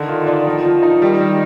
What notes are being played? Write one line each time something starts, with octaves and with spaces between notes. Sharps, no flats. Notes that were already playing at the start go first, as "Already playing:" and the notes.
Already playing: D3 D#3
F4
D4
F3
F3
D#4
D#3 G3
G3